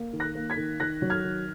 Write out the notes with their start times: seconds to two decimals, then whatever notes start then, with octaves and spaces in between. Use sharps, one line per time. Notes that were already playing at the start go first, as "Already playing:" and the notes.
Already playing: A#3
0.13 D#3
0.20 F#6 A#6
0.35 A#3
0.50 G#6 B6
0.57 D#3
0.80 D#3 F#6 A#6
1.02 F#3
1.10 F6 G#6
1.24 D#3